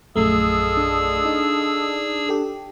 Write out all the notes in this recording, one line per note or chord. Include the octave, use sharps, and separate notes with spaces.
A#1 F#2 A3 F4 G#4 A4 D#5 E6
D4
D#4
G4 A4